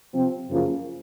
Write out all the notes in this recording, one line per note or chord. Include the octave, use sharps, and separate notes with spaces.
C3 F3 C4
F#2 C#3 F3 A#3 F4